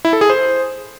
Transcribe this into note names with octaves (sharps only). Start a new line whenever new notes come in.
E4
A4
G#4
C5